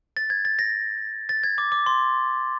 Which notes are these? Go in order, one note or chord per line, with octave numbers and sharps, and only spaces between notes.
A6
G#6
A6
A#6
A6
G#6
D6
D6
C6